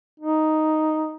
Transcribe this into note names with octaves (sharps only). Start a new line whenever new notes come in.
D#4